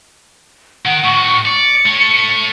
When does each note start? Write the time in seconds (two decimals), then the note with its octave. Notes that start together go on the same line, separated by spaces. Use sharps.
0.85 D#3 F#5
1.04 A2 F#4 C#6
1.45 D5 C#7
1.86 A3 C#5